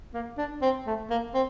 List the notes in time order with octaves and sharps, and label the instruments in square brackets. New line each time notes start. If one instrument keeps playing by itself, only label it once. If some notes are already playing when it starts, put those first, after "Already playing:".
[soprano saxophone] A#3
D4
C4
A3
A#3
C4